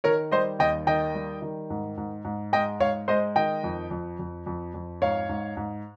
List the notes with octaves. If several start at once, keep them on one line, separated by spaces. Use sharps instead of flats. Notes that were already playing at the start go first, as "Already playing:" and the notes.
D#3 A#4 C#5
G3 C5 D#5
D#2 D#5 G5
D#3 D#5 G5
G3
D#3
G#2
G#2
G#2
G#3 D#5 G5
G#2 C#5 F5
G#3 C5 D#5
D#3 D#5 G5
F2
F2
F2
F2
F2
G#2 C#5 F5
G#2
G#2